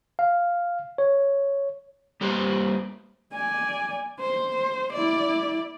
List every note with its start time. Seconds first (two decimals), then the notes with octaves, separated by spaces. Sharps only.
0.19 F5
0.98 C#5
2.21 G3 A#3 G4 B4 C5
3.33 D5 G#5
4.20 C5
4.92 E4 D5